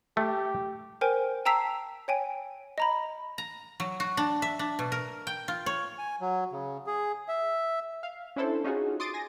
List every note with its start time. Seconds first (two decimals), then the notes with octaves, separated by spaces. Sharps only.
0.17 A3 G4
1.01 A#4 C5 G5 G#5
1.45 G5 A5 A#5 E6 B6 C7
2.08 C#5 G5 G#5
2.78 D#5 A#5 B5
3.38 A#5
3.80 F#3
4.00 F#4
4.17 D4
4.42 E5
4.59 D4
4.79 B2
4.92 A#4
5.27 G5
5.48 F4
5.66 C#5
5.98 G#5
6.21 F#3
6.52 C#3
6.86 G#4
7.28 E5
8.03 F5
8.36 C#4 D4 E4 A4 C5
8.64 C#4 D#4 F4 F#4 G#4
9.00 C6 D6 D#6 A6 D7
9.14 G#5 A#6